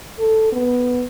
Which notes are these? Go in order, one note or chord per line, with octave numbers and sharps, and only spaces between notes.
A4
B3